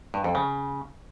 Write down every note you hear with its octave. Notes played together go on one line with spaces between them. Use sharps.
G2
F2
C#3